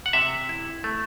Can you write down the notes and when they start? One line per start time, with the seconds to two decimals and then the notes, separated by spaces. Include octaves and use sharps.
0.06 F#5
0.13 C3 E5
0.49 E4
0.84 A3